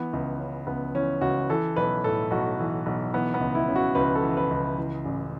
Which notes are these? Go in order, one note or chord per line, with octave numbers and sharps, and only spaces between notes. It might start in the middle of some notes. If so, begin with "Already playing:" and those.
Already playing: E3 B3
C#2
C#3
C#2 B3
E3 C#4
C#2 F#4
E3 A4
B1 B4
A2 A4
B1 F#4
E3
B1
E3 B3
B3
C#2
E4
C#3
F#4
C#2 B4
A4
E3
B4
C#2
E3
A1